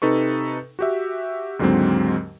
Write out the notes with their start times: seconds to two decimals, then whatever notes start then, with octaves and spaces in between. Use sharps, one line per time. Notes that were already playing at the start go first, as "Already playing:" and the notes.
0.02 C3 D#4 A4 B4 C#6
0.79 F#4 G4 E5
1.59 D#2 G#2 D3 F#3 G#3 C4